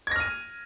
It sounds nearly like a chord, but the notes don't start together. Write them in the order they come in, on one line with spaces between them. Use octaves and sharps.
G#6 A#6 F6 D#7